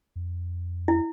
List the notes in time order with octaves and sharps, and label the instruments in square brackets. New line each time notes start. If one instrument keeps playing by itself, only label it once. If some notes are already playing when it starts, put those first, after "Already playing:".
[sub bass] F2
[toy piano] E4